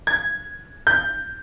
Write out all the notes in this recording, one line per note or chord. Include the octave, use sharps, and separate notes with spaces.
G#6
G6